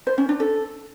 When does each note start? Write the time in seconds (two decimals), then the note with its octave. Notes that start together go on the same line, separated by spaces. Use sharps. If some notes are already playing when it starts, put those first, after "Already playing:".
0.07 C5
0.18 C#4
0.29 D4
0.40 A4